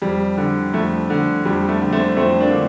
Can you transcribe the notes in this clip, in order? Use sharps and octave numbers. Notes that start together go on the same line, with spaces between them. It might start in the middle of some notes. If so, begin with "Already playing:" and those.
F2 G3
D3
F2 A3
D3
F2 G3
A3
D3
A3 C4
F2 A3 C4
A#3 D4
D3